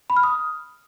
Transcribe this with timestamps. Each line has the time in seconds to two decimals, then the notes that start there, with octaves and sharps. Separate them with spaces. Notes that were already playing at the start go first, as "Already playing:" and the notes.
0.10 B5
0.17 F6
0.23 D#6